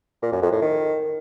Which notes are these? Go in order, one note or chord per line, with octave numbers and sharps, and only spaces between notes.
A#2
F#2
F2
A2
D#3